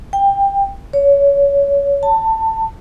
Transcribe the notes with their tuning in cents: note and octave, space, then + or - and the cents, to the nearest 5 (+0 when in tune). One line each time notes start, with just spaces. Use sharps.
G5 +20
C#5 +20
A5 +20